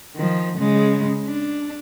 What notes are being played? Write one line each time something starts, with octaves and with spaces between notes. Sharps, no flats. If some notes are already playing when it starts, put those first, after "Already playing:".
D#3 F3
C#3 G#3
D4